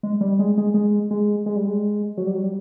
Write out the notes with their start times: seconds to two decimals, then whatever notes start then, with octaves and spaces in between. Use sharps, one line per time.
0.03 G#3
0.21 G3
0.39 G#3
0.58 G#3
0.74 G#3
1.11 G#3
1.46 G#3
1.56 G3
1.67 G#3
2.17 F#3
2.26 G3
2.35 F#3
2.44 G3